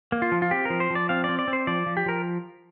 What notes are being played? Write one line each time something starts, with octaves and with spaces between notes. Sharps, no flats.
A#3
F4
F3
F4
C4 G4
F3 A#4
C5
F3 D5
C4 F5
C4 D5
D5
C4
C5
F3 D5
F3
G4
F3 A#4